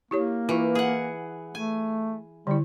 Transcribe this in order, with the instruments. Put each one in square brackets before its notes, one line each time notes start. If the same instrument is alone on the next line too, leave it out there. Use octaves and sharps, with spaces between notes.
[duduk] A#3 [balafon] E4 G4 C#5
[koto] E3 [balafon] E4 F4
[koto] G#4 F#5
[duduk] A3 [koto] G#5
[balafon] D3 E4 [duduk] G3